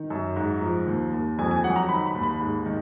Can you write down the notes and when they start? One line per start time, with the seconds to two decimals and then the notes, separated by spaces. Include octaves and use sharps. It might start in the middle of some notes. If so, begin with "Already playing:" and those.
Already playing: D#3
0.10 F#2
0.36 G#2 A#5
0.62 F3
0.87 D#2
1.13 D#2
1.39 F2 G#5
1.51 G#5
1.64 F#3 F#5
1.76 A#5
1.89 D#3 B5
2.07 B5
2.15 D#2
2.23 B5
2.40 G#2
2.66 D#3